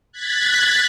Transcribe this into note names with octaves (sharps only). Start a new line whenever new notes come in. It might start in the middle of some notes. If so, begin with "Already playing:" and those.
F#6 G#6 A6 B6